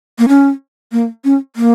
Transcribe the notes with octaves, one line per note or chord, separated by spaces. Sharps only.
A#3
C#4
A#3
C#4
A#3